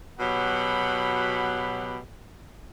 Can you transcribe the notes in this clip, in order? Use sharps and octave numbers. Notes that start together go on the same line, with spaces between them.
B2 F#3 G4 F#5 B5